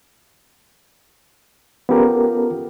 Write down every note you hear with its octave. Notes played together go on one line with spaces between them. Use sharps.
B3 C#4 F4 G4 A4 A#4